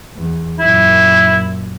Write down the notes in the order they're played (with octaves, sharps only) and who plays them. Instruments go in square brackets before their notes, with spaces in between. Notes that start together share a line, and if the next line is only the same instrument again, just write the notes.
[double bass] E2
[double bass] F#2 A#2 [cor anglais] E4